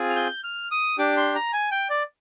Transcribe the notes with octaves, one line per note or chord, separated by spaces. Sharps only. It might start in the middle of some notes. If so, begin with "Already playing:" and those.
Already playing: C4 F4 G#4
F6
G6
F6
D#6
D4 G4 D6
C6
A#5
G#5
G5
D5